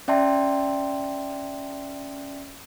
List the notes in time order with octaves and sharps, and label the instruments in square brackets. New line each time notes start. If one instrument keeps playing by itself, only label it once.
[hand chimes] C#4 D5 E5 G5 A5 C6